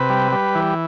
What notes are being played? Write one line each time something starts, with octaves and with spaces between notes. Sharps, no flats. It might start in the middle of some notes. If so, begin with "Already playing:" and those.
Already playing: C3 B4
G3
G3
E3